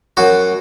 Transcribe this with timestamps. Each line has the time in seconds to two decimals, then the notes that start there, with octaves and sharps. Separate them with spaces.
0.17 F#2 F#4